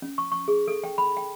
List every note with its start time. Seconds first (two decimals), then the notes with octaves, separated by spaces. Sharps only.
0.02 C#4
0.18 C#6
0.32 C#6
0.48 G#4
0.68 A4
0.84 G5
0.98 B5
1.17 G5